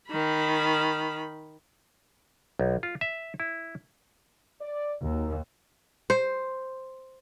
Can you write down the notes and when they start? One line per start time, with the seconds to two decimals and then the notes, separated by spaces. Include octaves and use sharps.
0.11 D#3 B5
2.59 B1
2.83 F4
3.01 E5
3.40 E4
4.61 D5
5.02 D#2 D#4 F#4 A#4
6.10 C5